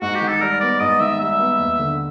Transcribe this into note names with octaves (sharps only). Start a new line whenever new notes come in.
G#2 F#4
G4
D#3
A4
G3 A#4
B3 D5
G#2 D#5
D#3 E5
G3 E5
B3
D#2
D3